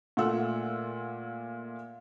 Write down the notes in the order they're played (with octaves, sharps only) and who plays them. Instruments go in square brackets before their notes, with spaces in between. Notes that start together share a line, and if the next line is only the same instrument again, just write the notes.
[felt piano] A#2 A3 F4 F#5 E6